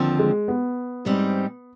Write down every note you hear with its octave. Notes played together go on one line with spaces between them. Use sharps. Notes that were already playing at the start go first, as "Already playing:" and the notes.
Already playing: D#2 D3 F3 C4
G#3
B3
G#2 G3 C4 D#4